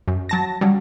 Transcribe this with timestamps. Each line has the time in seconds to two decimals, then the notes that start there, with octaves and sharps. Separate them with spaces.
0.08 F#2
0.29 F#3 A5 A#6
0.61 C#3 F#3 G3